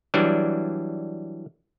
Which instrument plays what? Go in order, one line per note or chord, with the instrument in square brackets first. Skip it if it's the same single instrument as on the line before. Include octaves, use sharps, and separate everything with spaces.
[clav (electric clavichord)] E3 F#3 G3 D4